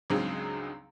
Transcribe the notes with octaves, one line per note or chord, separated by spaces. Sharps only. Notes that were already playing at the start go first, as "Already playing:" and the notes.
C#2 G2 F#3 G#3 C4 D#4